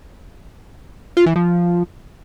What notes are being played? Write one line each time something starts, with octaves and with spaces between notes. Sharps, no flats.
F4
E3
F3